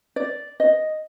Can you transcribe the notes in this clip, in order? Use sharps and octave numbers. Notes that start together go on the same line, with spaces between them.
D5
D#5